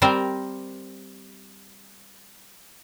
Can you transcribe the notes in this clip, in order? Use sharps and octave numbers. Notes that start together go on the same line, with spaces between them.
G3 C4 A#4 C5